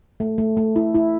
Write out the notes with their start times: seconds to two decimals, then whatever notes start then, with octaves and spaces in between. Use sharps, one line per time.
0.20 A3
0.38 A3
0.57 A3
0.76 E4
0.95 E4